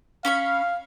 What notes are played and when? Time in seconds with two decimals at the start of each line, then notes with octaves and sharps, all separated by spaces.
0.25 C#4 F5 B5 C#6